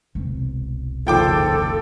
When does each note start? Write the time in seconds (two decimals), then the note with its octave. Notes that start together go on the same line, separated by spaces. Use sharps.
0.15 E1 C2
1.07 F#1 D#3 F3 A4 C5 G5 D6